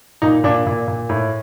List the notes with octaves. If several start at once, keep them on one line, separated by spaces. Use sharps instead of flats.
A#2 D#4
A#2 D4
A#2
A#2
A2